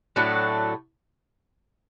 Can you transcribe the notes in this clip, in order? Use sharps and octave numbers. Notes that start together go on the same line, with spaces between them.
A2 F#3 A3 D4